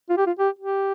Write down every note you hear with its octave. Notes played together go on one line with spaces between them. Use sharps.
F4
G4
F4
G4
G4